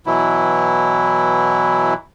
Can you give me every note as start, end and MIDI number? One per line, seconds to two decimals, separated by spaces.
0.07 1.94 47
0.07 1.94 52
0.07 1.94 54
0.07 1.94 64